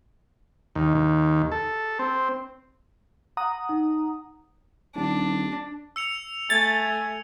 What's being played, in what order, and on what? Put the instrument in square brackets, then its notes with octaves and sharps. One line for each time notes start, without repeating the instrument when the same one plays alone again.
[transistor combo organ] D#2
D#2
A4
C4
[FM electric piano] F#5 A#5 D#6
[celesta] D#4
[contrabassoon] D#1 [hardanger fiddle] D4
[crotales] E6 C#7 F7
[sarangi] A3 [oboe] G#5 [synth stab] A6